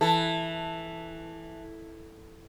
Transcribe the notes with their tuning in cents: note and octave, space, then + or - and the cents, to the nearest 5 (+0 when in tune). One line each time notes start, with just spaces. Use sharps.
E3 +0 A4 +0